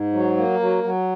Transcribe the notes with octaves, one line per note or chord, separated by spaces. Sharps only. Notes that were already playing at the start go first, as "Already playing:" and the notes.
Already playing: G#2
F#3
A#3
F#3
F#3